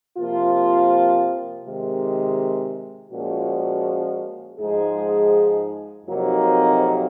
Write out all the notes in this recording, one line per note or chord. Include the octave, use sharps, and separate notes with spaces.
C3 F3 A#3 F4
C3 D#3 G#3
A#2 F3 G#3 C#4 F#4
G#2 F3 G#3 D#4 G#4
F2 C3 F#3 A#3 D#4